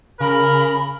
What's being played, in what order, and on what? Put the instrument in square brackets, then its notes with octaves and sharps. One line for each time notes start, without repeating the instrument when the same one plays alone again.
[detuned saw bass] C#3 [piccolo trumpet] A#4 [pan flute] B5